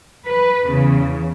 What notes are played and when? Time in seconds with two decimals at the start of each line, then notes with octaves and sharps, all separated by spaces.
0.24 B4
0.65 E2 C#3